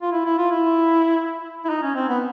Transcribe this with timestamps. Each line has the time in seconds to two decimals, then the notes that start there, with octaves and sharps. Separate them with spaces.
0.02 F4
0.12 E4
0.25 E4
0.38 F4
0.51 E4
1.65 E4
1.69 D#4
1.82 C#4
1.95 C4
2.09 B3